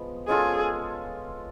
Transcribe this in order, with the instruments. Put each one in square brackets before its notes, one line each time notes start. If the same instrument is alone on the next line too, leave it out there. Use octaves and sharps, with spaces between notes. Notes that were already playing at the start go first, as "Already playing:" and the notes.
Already playing: [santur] F3 G#3 B3
[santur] G#3 C#4 F4 A4 [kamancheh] G#4